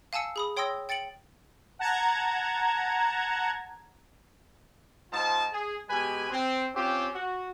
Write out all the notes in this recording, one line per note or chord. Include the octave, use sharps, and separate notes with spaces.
F5 G#5 A5 E6 C#7
G#4 B5 D#6
C#5 G5 C6 D#6 E6 A#6
G5 A6 C#7 D7 F#7
F#5 A5 A#5 G#6
G#2 F4 C5 D#5 A5
G#4
B2 G#3 G4 B4 G#5
C4
C4 C#4 F4 G4
F#4